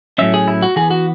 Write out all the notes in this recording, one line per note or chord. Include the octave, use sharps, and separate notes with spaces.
A2 F#3 C#4 E5
G#4
E4
F#4
E3 B3 G#4
F#4